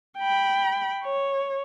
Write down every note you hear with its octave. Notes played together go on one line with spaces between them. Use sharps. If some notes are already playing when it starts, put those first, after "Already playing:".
G5 B5
C#5